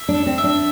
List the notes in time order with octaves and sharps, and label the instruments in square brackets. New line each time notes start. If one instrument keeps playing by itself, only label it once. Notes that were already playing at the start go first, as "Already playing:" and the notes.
Already playing: [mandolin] E5
[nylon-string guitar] D4
[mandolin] A4
[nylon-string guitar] C4
[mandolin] E5
[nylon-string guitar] D4